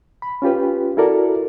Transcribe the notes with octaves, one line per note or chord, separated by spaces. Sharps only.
B5
C#4 F4 G4 B4
E4 F#4 A4 A#4 D5